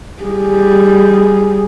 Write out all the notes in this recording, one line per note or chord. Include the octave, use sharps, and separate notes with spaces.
G3 G#4